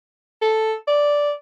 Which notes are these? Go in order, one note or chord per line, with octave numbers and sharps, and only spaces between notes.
A4
D5